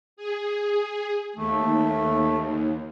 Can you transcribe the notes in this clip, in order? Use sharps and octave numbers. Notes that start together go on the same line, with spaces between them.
G#4
D#2 A3